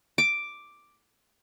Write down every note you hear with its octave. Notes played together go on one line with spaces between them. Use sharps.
D6